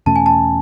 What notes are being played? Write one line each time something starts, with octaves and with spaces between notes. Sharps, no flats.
E2 B2 A3 C#4 A5
G#5
A5